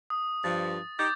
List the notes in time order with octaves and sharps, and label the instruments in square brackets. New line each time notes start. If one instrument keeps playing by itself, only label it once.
[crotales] D#6
[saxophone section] G2 F3 [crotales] A6
[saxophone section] D#4 G4 [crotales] D6 G6 A6